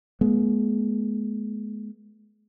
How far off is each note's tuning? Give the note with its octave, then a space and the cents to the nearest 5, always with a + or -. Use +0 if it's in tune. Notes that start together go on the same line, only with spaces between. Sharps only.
G#3 +30 B3 -35